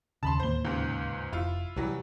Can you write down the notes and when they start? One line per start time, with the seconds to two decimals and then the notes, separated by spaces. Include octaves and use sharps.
0.23 D#2 C#3 A5 B5 C6
0.40 D1 D#2 A#3 C5 G7
0.65 C#2 G#2
1.32 F1 E4 F4
1.76 C2 E3 F#3 G3